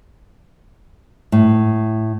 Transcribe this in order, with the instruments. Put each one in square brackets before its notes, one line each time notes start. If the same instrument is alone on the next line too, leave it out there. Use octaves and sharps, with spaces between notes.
[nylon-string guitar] A2